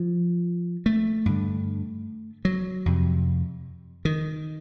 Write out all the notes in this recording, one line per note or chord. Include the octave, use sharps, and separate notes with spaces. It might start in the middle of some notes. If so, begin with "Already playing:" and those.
Already playing: F3
A3
G2 D3
F#3
F2 C3
D#3